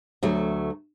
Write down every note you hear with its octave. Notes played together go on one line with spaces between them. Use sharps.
D2 F#3 A3